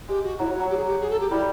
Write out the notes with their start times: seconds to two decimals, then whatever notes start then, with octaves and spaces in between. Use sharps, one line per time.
0.08 G#3 G4
0.23 F#4
0.39 F#3 E4
0.49 F#3
0.55 F#4
0.60 F#3
0.70 G4
0.77 G#4
0.85 G4
1.00 G#4
1.10 A4
1.20 G4
1.31 G3 E4